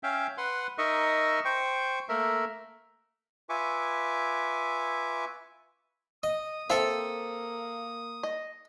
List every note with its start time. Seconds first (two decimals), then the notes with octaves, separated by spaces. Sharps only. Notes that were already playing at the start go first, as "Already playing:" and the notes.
0.03 C#4 E5 F5 G5
0.38 B4 F#5 C6
0.78 D#4 A#4 D#5 E5 C#6
1.45 C5 G5 C#6
2.09 A3 A#3 A#4 E5
3.49 F4 B4 E5 G#5 C#6 D6
6.23 D#5 D#6
6.70 A#3 C4 A4 E5 F5
8.23 D#5